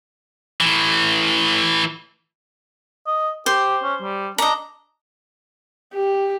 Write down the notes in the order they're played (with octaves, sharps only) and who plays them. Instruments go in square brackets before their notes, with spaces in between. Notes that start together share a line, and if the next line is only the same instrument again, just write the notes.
[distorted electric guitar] A2 E3
[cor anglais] D#5
[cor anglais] G4 [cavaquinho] C5
[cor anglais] C#4
G3
[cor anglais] D4 [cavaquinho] D#5 A#5
[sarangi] G4